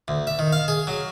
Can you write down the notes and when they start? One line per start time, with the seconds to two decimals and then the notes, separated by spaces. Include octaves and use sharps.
0.08 D2
0.27 E5
0.39 D#3
0.52 F5
0.68 G#4
0.87 F#3